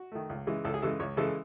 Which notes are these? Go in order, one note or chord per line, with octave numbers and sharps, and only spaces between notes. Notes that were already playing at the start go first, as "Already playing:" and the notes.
Already playing: F#4
D#3 A3
C#2
C#3 E3 G#3
C#2 A4
G#4
C#3 E3 G#3 A4
C#2 C#5
C#3 E3 G#3 A4